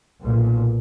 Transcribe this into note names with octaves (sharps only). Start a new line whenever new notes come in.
B1 A#2